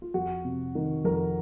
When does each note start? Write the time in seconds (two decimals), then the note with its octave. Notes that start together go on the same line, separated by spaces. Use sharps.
0.02 F4
0.14 F2 F#4
0.45 C3
0.75 D#3
1.04 F2 A#4